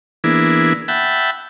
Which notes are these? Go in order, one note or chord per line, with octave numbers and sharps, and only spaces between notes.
E3 A#3 B3 D4 E4 G#4
E5 F#5 G5 A5 B5